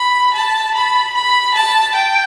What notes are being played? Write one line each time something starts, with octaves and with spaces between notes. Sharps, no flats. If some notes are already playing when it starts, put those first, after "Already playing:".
Already playing: B5
A5
B5
B5
A5
G5